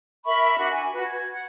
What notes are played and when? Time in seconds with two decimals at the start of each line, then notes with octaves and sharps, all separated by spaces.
0.25 A#4 E5 B5 C#6
0.57 D4 F#4
0.71 G#5 C#6
0.93 F#4 B4
1.04 G#6
1.33 F#5